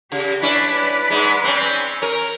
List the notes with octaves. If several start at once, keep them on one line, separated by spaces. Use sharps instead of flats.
C#3 G4
C#4 D4 E4 B4 D5
G#2 G#3
C4 C#4
C#4 A#4